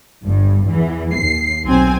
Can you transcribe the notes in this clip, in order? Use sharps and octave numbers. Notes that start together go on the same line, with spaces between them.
G1 G2
E2 E3
D#2 C7
B1 C4 G#5